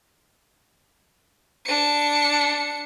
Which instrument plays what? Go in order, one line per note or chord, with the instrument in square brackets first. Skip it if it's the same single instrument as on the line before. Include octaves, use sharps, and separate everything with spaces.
[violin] D4 C#7